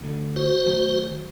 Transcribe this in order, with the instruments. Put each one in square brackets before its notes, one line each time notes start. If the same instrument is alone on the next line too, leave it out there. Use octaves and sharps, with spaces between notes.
[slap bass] D2 D3
[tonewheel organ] F#4 C5
[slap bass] D#3 F#3 A3